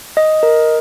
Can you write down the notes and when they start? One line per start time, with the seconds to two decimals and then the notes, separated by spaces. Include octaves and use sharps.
0.17 D#5
0.43 A#4